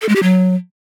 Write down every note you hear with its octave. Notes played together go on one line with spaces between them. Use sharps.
A4
G#3
G4
F#3